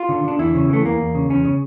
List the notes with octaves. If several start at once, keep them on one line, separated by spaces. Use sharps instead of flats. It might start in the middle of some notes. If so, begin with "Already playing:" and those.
Already playing: F4
D3
D3 D4
E2 E4
C#3
E3 A3
E2 A#3
E2
C#3
E2 C#4
C#3